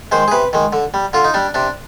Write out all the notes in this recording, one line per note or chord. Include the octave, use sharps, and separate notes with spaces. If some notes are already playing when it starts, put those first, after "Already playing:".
D#3 G#3 C5
G#4
C3 B4
D#3 G#3
D3
G3
D3 F4
D#4
G3 D4
C3 D4